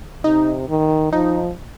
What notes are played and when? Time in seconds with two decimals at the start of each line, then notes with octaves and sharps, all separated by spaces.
0.24 C3 D#4
0.69 D#3
1.12 F3 D#4